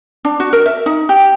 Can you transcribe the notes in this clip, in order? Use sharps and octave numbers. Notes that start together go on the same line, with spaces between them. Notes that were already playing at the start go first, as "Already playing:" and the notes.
D4
F#4
A#4
E5
D#4
G4